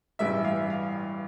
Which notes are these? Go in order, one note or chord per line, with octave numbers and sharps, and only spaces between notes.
A1 G2 E3 G3 E5
F5
F5